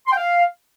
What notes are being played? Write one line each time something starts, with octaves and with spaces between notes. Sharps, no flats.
C6
G5
F5